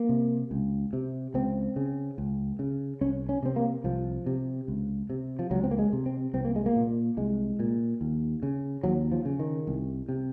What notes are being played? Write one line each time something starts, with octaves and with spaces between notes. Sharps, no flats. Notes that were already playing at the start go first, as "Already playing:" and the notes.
Already playing: A#3
C3
C#2
C3
C#2 C4
C#3
C#2
C#3
C2 C#4
C#4
C3 C4
A#3
C2 F3
C3
C#2
C3
F3
C#2 F#3
C4
A#3
G#3
C3
C4
C2 C4
A#3
G#3
A#3
A#2
C2 G#3
A#2
D#2
C#3
D#2 F#3
F3
C#3
D#3
C2
C3